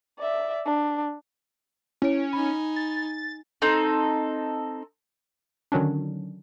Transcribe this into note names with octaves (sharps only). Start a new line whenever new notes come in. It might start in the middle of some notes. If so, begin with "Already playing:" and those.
D5 E5
D4
C#4 E4 C#5 D7
D#4 G#5 B5
A6
C4 D#4 A4
D3 D#3 F#3 C#4 D4